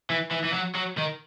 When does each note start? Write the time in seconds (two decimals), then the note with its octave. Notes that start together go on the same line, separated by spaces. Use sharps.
0.10 E3
0.31 E3
0.45 E3
0.54 F#3
0.75 F#3
0.98 D#3